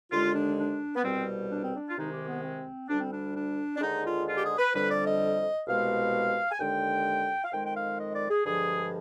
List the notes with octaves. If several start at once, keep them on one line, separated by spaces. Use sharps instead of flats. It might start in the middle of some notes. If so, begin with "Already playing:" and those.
D#2 D3 G#3 F4
D4
D4
B3
C2 B2 G3 C4
D4
C4
D4
F4
C2 C3 D#3 G#3 D#4
G4
B3
C4
D2 D3 G3 D4
C4
D4
D4
D4
D#2 D3 G#3 D#4
F4
F4
G4
G#4
B4
F2 D3 G3 B4
D5
D#5
C2 B2 G#3 F5
G#5
D#2 D3 G#3 G5
F5
F2 D#3 G#3 G5
G5
F5
D#5
D5
G#4
G2 D3 F3 G#3 G#4